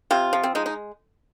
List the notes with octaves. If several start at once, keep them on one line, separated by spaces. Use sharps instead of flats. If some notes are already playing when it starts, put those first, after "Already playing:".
C3 F4
F3
C4
G#3 D#4
D#4